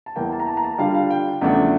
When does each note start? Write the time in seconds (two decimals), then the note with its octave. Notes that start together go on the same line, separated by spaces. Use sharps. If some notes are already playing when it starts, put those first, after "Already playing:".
0.06 A5
0.16 E2 E3 A#3 G5
0.32 A5
0.40 A#5
0.47 A5
0.57 A#5
0.64 A5
0.78 D3 G3 D4 F4 F5
0.95 F5
1.10 G5
1.41 E2 C#3 F3 A3 D4